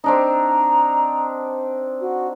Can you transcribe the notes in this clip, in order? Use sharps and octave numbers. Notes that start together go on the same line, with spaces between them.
C4 D4 D#4 A#5
F#4